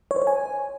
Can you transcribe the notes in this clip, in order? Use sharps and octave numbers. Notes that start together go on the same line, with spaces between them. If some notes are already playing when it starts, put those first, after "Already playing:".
C#5
C5
C#5
G#5